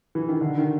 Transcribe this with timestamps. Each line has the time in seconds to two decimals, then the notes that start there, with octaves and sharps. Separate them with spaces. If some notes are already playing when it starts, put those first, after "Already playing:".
0.15 E3
0.28 D#3
0.41 D3
0.58 D#3